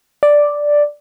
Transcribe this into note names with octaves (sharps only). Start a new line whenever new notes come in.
D5